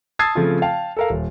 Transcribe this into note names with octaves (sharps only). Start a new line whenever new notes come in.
A5 D#6 E6 G#6 A6 C7
C#3 F3 A3 C4 F4
F5 G5 A5
A4 A#4 F5
D#1